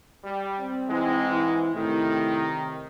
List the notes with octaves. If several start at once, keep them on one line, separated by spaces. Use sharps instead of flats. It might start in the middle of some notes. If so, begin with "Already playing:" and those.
G3 G4
C4
G#2 E3 G#3
E3
A2 C3 D#3